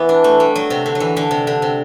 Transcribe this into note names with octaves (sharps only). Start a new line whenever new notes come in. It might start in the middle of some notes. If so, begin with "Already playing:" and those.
Already playing: E3 B3
D4
A3
G3
F#3
C3
D3
F#3
E3
D3
C3
D3
C3